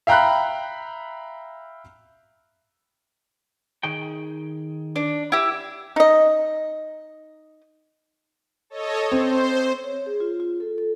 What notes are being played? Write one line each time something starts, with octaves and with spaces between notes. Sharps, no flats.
E5 F5 G5 A#5 B5 F#6
D#3 G#4 G5
D4
E4 G4
D#4 D#5
A4 C#5 D#5
C4 C5
C#5
G#4
F4
F4
A4
A4